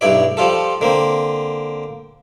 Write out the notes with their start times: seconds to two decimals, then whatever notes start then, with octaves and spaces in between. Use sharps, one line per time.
0.01 B1 G2 E4 D5
0.37 F3 G3 F4 A4
0.81 D3 A#3 C4